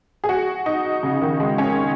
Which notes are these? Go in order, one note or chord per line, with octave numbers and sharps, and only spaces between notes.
G#4
F#4
D#4
C#3
D#3
G#3
C#4